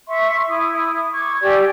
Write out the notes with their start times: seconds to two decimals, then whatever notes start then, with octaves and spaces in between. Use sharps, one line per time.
0.07 E5 C6 C#6
0.49 E4 D#6
1.13 C#6 D6 G#6
1.43 G4 D5 G#5 E6